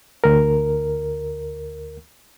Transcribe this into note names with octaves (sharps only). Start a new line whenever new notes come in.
D2 A#4